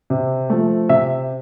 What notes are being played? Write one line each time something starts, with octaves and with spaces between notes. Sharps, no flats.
C3
F3 A3
C3 E5